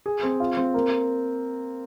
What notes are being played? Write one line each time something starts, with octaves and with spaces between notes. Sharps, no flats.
G#4
C4
F4
C4
A#3